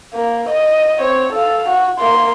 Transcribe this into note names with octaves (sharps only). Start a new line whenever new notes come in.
A#3
D#5
C4 C#5
A4 F5
F#4
A#3 C6